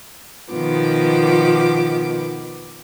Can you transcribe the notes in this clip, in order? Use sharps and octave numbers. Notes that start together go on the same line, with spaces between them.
B2 D#3 F3 B3 D6